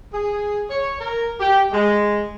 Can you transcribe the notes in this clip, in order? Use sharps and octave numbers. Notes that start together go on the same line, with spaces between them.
G#4
C#5
A#4
G4
G#3